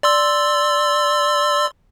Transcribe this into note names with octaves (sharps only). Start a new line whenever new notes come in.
D5 C6 E6